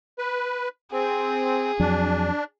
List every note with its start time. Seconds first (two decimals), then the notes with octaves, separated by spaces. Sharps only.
0.18 B4
0.92 C4 G#4
1.80 F2 F#3 D4